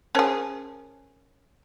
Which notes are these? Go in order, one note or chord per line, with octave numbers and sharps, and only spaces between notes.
C#4 G#4 A#4 C5 A5